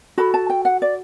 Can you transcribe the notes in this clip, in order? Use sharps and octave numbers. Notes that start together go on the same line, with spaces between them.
F#4 A4 B5
A5
G5
F#5
D5